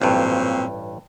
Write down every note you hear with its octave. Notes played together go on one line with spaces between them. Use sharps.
A1 G2 A#2 F#3 C4